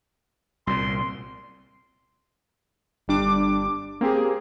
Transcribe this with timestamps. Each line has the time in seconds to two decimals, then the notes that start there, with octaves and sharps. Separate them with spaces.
0.67 C2 A#2 C6
3.08 G1 G3 D4 D6
4.01 A#3 C4 G4 G#4